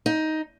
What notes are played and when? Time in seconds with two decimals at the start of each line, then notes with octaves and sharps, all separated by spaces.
0.06 D#4